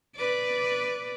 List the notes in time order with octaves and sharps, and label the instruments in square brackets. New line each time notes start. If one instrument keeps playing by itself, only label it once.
[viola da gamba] B4 D5